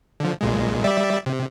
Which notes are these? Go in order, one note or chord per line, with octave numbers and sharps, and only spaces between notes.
D3 F3
B1 A#2 G#3
G3 D5 E5
C3